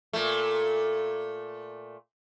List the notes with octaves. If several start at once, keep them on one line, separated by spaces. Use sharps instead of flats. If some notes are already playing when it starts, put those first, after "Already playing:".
A#2 A3